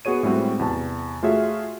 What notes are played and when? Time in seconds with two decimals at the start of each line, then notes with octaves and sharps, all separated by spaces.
0.05 B3 F#4 G#4 C#5 D#7
0.23 A2 G3 G#3 C4 F#4
0.59 E2 C3 A5
1.23 A3 F4 F#4 G#4 C#5 E5